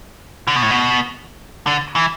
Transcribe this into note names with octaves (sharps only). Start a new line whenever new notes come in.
D3
B2
A2
B2
D3
E3